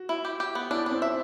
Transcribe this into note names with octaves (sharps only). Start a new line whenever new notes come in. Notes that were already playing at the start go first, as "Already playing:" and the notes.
Already playing: F#4
E4
G4
G4
B3
D4 E4
C4 D4
E5